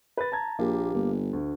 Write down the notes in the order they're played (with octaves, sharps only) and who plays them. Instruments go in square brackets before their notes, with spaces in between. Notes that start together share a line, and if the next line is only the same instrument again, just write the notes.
[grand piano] B4 A6
A5 A#5 G#6
[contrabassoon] A#1 [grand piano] A#3 G4
[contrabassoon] G1
[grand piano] D2